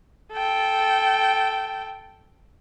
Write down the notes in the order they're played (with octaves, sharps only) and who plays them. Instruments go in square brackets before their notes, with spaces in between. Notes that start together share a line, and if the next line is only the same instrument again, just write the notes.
[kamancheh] A4 G5